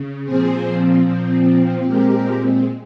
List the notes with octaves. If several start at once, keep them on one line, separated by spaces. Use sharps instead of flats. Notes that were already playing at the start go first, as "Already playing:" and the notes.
Already playing: C#3
A#2 F3 C4 G#4 C5
A#2 F3 C4
A#2 G#3 C4 G4 A#4